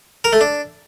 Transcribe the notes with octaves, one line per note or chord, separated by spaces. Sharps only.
A#4
A3
D4